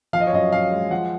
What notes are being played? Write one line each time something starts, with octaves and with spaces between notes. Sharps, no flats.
F3 F5
D#5
C#5
F#2 D#5
F#2 F5
G#3
F3 F#5